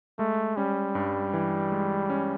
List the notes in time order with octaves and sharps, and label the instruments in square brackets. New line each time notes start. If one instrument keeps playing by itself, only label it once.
[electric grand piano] G#3 [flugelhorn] A3
[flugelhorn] G3 [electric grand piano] C#4
[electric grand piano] G2
E3
G#3
C#4